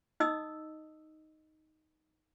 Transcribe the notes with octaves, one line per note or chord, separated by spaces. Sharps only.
D#4 D#5 D#6 E6